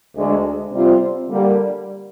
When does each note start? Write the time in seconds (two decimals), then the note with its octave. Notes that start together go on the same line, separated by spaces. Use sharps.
0.15 D2 D3 G#3
0.71 C3 G3 C4 F4
1.29 D3 G3 A#3